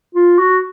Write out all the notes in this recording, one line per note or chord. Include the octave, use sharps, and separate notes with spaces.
F4
F#4